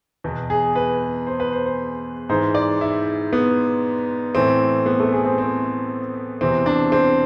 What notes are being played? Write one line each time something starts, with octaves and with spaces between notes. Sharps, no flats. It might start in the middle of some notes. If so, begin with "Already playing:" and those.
E2 B2
G#4
B4
C5
B4
C5
C5
G#2 E3 C5
D5
E4
B3
A2 E3 C4
B3
A3
G#4
C4
C4
E2 C3 E3 C4
D4
C4